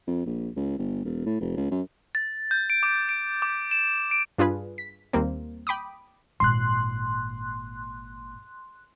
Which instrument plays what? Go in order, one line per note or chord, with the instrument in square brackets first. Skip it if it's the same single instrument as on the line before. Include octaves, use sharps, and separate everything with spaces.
[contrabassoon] F2
A#1
C#2
G1
E1
A2
F1
C#2
F#2
[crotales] A6
G6
D7
D6
D7
D6
E7
D7
[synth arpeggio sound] G2 D4 F4 G#4 B4
B6
D#2 G3 A#3 C4
G5 B5 D6 D#6
[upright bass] G#1 A#2 [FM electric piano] C6 F#6